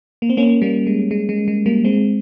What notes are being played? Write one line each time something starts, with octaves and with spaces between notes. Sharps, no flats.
A#3
C4
A#3 C#4
G3 A#3
G#3
G#3
G#3
G#3
G3 A#3
G#3 C4